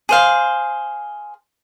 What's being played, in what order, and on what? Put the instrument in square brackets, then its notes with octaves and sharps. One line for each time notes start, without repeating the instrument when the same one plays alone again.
[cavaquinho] G#4 C5 F5